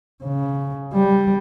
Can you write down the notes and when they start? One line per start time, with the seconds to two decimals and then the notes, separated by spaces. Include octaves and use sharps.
0.23 C#3
0.93 G3